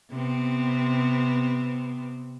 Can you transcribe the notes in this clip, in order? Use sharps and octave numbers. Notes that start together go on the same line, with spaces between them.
C3 B3 C4